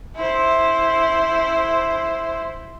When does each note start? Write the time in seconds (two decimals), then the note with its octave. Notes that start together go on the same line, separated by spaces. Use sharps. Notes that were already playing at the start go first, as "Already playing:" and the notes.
0.16 E4 C5